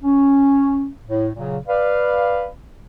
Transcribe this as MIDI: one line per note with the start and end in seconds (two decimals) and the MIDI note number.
0.03 0.89 61
1.06 1.30 45
1.35 1.58 46
1.35 1.58 49
1.35 1.58 54
1.68 2.48 71
1.68 2.48 74
1.68 2.48 77